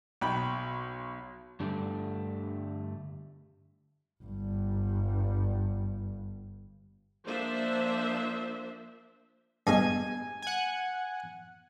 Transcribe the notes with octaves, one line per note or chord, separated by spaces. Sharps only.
B1 G5 B5
G2 D3 G3 A3
G1 G2
F3 A#3 D4 C5 E5
G2 B2 G#3 G#5
F#5 G#5